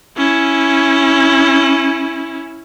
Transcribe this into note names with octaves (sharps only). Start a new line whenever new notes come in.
C#4 E4